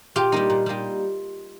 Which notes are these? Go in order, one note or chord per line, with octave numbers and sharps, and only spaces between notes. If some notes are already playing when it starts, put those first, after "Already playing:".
A#2 F4 G4
G3 A#3 D#4
A#2
G3 A#3 D#4